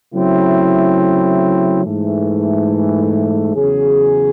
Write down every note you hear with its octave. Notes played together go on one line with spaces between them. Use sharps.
C#3 F#3 A3 C4 E4
G#2 E3 A3
E2 C#3 F#3 C#4 G#4